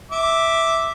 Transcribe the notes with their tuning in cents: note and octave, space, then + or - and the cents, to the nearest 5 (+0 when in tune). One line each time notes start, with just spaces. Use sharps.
E5 -5 D6 +0